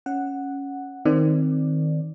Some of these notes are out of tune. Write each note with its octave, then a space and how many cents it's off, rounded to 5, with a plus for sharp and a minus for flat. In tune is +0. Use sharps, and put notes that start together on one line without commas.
C#4 +0 F#5 +0
D#3 +5 C4 +0 D5 +10